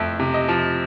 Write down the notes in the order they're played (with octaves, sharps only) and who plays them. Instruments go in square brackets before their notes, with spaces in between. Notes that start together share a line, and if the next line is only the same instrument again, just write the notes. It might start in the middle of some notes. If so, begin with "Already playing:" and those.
Already playing: [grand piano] F2 C3 A3 E5
C3
D#5
F3